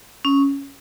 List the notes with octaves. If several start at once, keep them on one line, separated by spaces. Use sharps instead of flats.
C#4